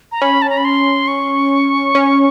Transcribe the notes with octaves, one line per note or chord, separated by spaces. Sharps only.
A#5
C#4 B5
A5
A#5
B5
C6
C#6
C#4